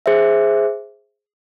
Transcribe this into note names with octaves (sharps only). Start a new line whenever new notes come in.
G#4 C5 E5